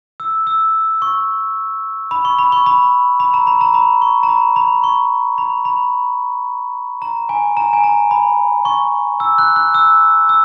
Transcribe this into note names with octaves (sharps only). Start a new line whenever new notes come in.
E6
E6
C#6
B5
C#6
B5
C#6
B5
B5
A#5
B5
A#5
B5
C#6
A#5
B5
B5
C#6
B5
B5
A#5
G#5
A#5
G#5
A#5
B5
C#6
E6
F#6
F#6
E6
E6